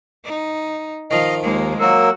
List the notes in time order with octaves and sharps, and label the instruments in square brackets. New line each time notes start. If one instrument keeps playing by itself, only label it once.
[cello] D#4
[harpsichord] D#3 F3 [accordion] D#5 [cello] F5
[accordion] D#2 [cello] G#3 A#3
[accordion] F#3 A#3 A#4 [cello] F#4 [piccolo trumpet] E6